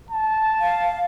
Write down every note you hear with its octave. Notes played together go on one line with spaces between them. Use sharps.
A5
F5